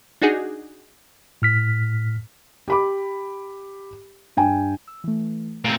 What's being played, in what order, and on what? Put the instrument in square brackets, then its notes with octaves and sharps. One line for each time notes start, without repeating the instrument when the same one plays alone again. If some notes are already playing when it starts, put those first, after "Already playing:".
[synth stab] D4 D#4 F#4 G#4
[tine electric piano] A2 F6 B6
[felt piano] G4 B5 D6
G2 G5 G#5
[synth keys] E6
E3 A3
[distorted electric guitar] A#2 C4 [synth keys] A3 G#5 G#6